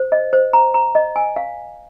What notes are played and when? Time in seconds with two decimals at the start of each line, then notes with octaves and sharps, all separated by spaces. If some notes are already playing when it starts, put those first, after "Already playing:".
Already playing: C5
0.12 D#5
0.33 C5
0.53 A#5
0.74 A#5
0.95 D#5
1.16 G#5
1.36 F5